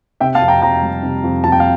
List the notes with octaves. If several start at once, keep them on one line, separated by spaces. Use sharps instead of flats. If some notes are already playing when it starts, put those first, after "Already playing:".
C3 E5 G5
F5 A5
F2
G5 A#5
F2 G5 A#5
G3
C3
F2
F2 A5
G5
F5